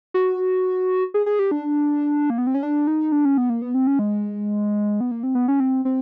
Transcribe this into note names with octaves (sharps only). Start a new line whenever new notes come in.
F#4
G#4
G#4
G4
D4
A#3
B3
C4
C#4
D4
D#4
D4
C#4
B3
A#3
B3
C4
C#4
G#3
B3
A#3
C4
B3
C#4
C4
C4